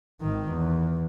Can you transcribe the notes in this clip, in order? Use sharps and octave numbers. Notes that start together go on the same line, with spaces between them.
G#1 D#3
E2